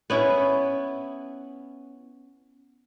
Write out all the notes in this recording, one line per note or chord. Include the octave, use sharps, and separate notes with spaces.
B3 C#4 E4